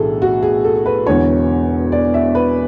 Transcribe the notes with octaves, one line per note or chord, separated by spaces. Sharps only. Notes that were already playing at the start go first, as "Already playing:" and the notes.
Already playing: B1 A2 E3 A3 D4 G#4 A4
F#4
G#4
A4
B4
E1 E2 D3 C#5
D5
E5
B4